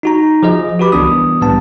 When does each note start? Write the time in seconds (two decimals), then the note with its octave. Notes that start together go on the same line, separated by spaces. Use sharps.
0.03 D#4 F#4 A#5
0.43 F3 G#4 D#5
0.79 F#4 G4 B4 B5 D6
0.92 C2 E3 B3 D4 D#6
1.41 A2 G3 B3 A5